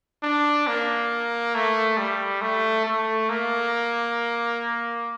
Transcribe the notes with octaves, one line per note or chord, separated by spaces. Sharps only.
D4
A#3
A3
G3
A3
A3
A#3